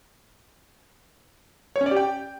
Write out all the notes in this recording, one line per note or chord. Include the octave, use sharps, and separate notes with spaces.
C#5
C#4
D5
G4
G5